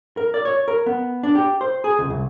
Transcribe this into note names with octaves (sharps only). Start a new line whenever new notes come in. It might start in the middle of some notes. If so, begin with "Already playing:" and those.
A#4
D5
C#5
A#4
B3
D4
G4
C5
G#4
C#2
C2